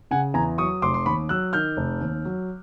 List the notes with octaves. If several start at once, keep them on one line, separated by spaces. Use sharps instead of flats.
C#3 F#5 G#5
E2 G#5 A#5
F#3 C#6 D#6
F1 C6 D6
C6
D#2 B5 C#6
F#3 E6 F#6
D#3 F6 G6
F1
D#2
F#3